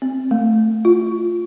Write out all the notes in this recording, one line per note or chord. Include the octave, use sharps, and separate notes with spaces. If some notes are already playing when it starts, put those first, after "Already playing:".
C4
A3
F4